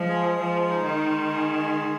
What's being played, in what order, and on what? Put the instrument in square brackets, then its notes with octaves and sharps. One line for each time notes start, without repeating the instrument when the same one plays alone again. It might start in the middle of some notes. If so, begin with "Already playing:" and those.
Already playing: [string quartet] F3 [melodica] G#3
[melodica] G#4
[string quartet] F3 [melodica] G#3
[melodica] D#4
[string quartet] D#3
[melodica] G#3
G#4
G#3